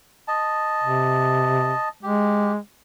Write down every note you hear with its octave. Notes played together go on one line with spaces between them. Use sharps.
D#5 A5
C3
G#3 G4